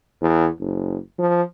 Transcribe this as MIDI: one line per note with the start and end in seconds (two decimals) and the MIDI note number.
0.22 0.48 40
0.59 0.97 30
1.19 1.42 53